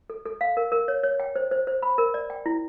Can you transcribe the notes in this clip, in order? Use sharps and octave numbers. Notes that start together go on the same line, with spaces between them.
A4
A4
F5
A#4
A#4
C#5
C#5
G5
C5
C5
C5
B5
A#4
D5
G5
E4